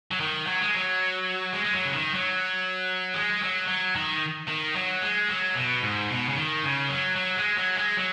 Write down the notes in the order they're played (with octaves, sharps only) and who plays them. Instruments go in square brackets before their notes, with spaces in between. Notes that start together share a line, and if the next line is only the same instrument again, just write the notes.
[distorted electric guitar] F#3
D#3
F#3
G#3
F#3
G#3
G#3
F#3
C#3
D#3
F#3
G#3
F#3
F#3
D#3
D#3
F#3
G#3
F#3
B2
G#2
B2
C#3
D#3
C#3
F#3
F#3
G#3
F#3
G#3
F#3